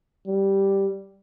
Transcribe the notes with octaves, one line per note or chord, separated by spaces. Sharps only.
G3